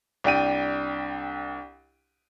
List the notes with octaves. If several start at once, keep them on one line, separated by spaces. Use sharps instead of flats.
C2 D4 G5 D#7